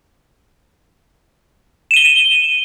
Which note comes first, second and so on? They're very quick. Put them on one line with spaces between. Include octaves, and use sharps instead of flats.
E7 D#7 G7